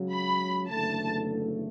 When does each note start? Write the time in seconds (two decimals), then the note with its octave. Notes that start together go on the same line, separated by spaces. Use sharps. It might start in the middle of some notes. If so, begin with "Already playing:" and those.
Already playing: C#2 C#3 F#3
0.12 B5
0.69 F#1 E2 D3 A3 A5